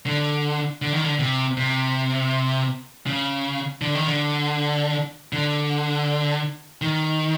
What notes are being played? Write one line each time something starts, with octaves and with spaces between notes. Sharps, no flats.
D3
D3
D#3
D3
C3
C3
C#3
D3
D#3
D3
D3
D#3